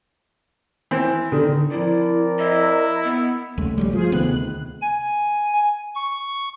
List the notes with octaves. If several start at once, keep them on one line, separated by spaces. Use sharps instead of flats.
E3 C4
D3 D#3
F3 C4 E4 A#4 D5
E4 D#5
B3
D#2 C#3 G#3 A3
G1 F#3 G3
F3 F4 G#4 C5
D2 C3 D#3 B3 F#6
G#5
C#6